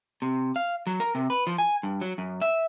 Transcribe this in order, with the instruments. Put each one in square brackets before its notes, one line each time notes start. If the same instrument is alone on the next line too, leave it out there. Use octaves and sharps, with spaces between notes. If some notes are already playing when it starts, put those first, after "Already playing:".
[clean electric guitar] C3
F5
F#3
A#4
C3
B4
F3
G#5
G2
F#3
F#2
E5